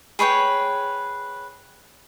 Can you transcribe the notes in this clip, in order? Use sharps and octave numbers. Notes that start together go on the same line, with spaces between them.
G#4 B4 C#5 G5